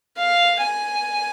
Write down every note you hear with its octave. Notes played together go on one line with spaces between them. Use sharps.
F5
G#5